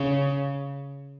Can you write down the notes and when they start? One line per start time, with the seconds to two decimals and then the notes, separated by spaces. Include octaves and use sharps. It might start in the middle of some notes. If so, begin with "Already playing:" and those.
Already playing: C#3